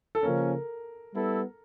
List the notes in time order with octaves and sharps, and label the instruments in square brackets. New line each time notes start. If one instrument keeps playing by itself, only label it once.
[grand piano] A4
[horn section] C#3 F3 A#3 C#4 [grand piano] A#4
[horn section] G3 B3 E4 A4